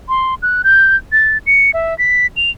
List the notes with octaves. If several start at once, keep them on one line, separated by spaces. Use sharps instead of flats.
C6
F#6
G6
A6
C#7
E5
B6
F7